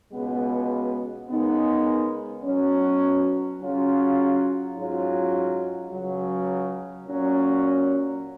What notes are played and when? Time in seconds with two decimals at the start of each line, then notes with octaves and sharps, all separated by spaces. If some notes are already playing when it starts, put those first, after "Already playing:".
0.11 C#2 B2 G#3 B3
1.28 C#3 G#3 B3 D#4 A#4
2.44 B2 F#3 C#4
3.59 C#3 F#3 C#4 F4
4.75 G#2 F#3 C#4 F4
5.91 C#2 C#3 F#3
7.07 A#2 F#3 C#4